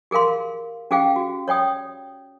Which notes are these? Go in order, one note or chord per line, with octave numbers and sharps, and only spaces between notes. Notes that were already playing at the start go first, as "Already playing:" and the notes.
G4 G#4 A#4 F5 C6
C#4 G4 G#4 F5 G5
F#4
C#5 D5 G5 D#6